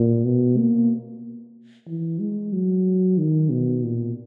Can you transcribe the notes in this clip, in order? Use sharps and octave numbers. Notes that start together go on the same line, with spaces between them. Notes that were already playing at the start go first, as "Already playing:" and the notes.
Already playing: A#2
B2
A#3
E3
G#3
F#3
D#3
B2
A#2